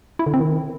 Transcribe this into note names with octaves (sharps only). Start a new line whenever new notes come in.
E4
D3
C4
D#3